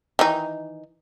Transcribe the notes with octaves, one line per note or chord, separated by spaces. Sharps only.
D#3 E3 D#4